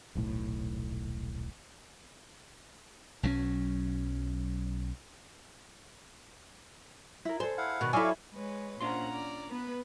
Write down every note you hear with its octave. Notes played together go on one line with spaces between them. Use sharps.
D#1 B1 A2
B1 F#3 G3 C#4
E4 A#4
G#4 A4 C5
E4 F5 F#5
B2 D#3 F#4 B4
F#3 E4 A4 D5 F5 G#5 C#6
G#3 B4 C#5
A#2 C#4 D4 F4 C5 F#5 A#5 C6
D5
B3 B4